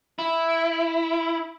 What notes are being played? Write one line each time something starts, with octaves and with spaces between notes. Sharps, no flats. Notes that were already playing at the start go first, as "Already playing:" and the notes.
E4